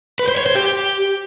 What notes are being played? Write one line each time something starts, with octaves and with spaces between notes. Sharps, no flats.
B4
C5
C#5
C5
G4